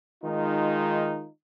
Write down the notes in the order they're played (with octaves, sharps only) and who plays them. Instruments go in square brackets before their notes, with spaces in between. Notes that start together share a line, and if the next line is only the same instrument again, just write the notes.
[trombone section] D#3 G#3 D#4 F4